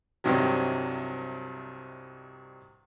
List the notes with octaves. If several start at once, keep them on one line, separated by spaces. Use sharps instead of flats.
C2 G2 C3 D#3 F#3